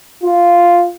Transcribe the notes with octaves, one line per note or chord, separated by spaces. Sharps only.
F4